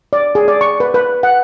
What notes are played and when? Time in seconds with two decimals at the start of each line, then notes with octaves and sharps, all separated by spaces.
0.13 D5
0.35 G#4
0.48 D5
0.61 C#6
0.80 B4
0.94 B4
1.23 F#5